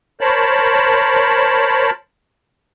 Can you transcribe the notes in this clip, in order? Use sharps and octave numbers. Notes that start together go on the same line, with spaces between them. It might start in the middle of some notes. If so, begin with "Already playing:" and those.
A#4 C5 C#5 A5 B5